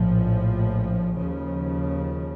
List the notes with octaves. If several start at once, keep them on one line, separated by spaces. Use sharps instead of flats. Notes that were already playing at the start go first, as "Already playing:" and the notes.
Already playing: A#1 A2 F3
D#2 C#3 F3